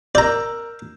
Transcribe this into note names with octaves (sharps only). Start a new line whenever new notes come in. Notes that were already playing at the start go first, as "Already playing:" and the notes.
A#4 D5 A#5 E6 G6